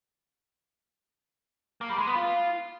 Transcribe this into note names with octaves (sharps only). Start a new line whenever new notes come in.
A#3
G3
G#3
B3
F4